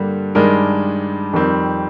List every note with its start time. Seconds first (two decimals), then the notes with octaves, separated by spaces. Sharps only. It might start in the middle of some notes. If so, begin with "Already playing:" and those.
Already playing: G2 D3 G3 A#3
0.35 G2 D#3 G#3 D4 A#4
1.33 F2 D#3 G3 C4